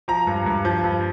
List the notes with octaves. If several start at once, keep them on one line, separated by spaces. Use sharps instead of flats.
F3 A#5
G2
G2
F3
G2